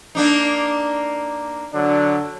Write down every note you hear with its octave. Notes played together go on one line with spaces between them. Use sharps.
A#3 D4 D#4
D3 F#3 D4